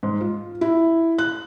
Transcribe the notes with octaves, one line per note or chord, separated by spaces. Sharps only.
G#2
F4
E4
F#6